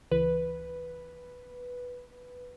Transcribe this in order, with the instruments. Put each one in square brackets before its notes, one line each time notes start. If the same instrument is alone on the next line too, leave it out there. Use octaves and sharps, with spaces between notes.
[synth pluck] C#2 E3 [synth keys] B4